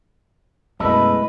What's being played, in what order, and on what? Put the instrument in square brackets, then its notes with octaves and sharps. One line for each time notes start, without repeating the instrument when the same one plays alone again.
[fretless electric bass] F#2 B2 [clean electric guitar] G#3 A3 A4 [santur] E4 D#5 [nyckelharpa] B4